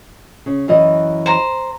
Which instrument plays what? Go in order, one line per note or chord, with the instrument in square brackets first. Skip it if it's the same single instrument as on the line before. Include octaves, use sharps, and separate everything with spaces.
[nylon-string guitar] C#3
F#2 E3 D#5
[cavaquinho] C5 A#5